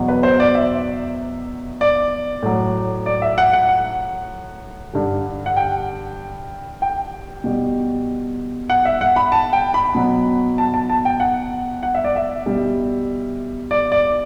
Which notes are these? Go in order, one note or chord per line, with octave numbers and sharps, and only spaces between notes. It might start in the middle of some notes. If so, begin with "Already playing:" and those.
Already playing: E2 B2 F#3
B4
C5
D5
E5
D5
A2 F#3
D5
E5
F#5
F#5
F#5
G2 D3 G3
F#5
G5
G5
B2 G3
F#5
E5
F#5
B5
A5
G5
B5
B2 F#3
A5
A5
A5
G5
F#5
F#5
E5
D5
E5
B2 G3
D5
D5